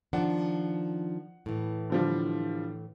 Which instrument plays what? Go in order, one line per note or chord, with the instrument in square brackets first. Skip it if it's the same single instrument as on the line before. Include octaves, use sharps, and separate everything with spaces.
[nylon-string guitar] D#3 F3 D4 [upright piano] F#5
[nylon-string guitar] A2 E3
[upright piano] D3 F3 G3